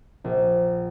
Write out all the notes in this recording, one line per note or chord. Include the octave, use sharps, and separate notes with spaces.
A#1